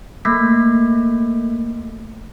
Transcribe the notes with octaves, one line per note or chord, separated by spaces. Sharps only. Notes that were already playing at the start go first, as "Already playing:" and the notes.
A3 A#3 B6